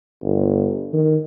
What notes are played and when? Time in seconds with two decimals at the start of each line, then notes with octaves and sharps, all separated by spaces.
0.23 G1
0.93 D#3